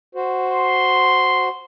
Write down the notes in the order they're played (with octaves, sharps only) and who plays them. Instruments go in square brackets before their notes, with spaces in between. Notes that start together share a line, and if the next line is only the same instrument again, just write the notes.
[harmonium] F#4 C5
[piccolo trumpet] C6